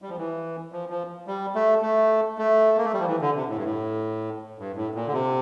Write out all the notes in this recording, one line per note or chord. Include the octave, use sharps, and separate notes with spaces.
G3
F3
E3
F3
F3
G3
A3
A3
A3
A#3
A3
G3
F3
E3
D3
C3
A2
G2
A2
G2
A2
A#2
D3
C3